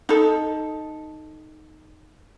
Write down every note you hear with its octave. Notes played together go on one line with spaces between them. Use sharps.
D#4 A4